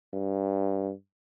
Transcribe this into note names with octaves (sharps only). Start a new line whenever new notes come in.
G2